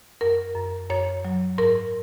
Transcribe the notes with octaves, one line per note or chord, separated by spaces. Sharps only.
F#2 A#4
F#2
F#2 C#5
F#3
G#2 A#4